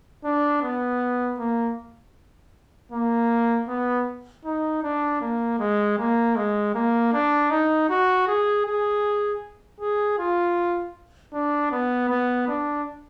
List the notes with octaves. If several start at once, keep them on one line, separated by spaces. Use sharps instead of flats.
D4
B3
A#3
A#3
B3
D#4
D4
A#3
G#3
A#3
G#3
A#3
D4
D#4
F#4
G#4
G#4
G#4
F4
D4
B3
B3
D4